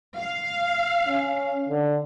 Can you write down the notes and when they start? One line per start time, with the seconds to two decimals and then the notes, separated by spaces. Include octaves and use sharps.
0.17 F5
1.07 C#4
1.69 D3